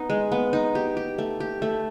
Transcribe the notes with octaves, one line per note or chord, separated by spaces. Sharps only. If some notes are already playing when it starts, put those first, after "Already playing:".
Already playing: B3 D#4
G#3
B3
D#4
G4
G4
A3
G4
A3